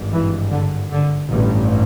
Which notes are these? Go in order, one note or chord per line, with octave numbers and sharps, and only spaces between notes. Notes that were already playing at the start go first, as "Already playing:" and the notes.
Already playing: G#1 G2
E3
D3
D3
A1 G2